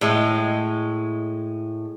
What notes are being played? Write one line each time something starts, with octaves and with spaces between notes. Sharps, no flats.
A2 G#3